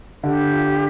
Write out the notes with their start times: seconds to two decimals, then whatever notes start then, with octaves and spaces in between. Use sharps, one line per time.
0.23 D3 G4
0.52 F4